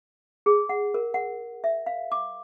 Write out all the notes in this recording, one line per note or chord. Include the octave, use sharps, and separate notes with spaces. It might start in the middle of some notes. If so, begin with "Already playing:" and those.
G#4
F#5
A#4
F#5
E5
F5
D6